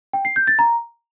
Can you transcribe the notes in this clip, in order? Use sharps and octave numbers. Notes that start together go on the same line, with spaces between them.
G5
C7
G6
A6
A#5